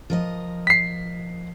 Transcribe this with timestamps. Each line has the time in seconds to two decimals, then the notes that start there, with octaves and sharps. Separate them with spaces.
0.10 F3 A#4 D#5
0.67 B6 C7